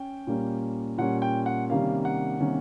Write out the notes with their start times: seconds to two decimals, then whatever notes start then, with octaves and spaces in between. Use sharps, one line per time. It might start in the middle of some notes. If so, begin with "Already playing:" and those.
Already playing: C#4 G5
0.27 A#2 G3 A#3 C#4
0.98 A#2 G3 A#3 C#4 F#5
1.22 G5
1.46 F#5
1.69 C3 D#3 G3 A#3 C#4 F5
2.05 F#5
2.40 C3 D#3 G3 A#3 C#4